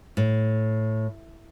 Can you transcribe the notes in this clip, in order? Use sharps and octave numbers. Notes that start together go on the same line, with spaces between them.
A2